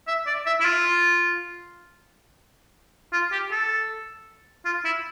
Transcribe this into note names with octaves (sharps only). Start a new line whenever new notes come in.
E5
D5
E5
E4
F4
F4
G4
A4
F4
E4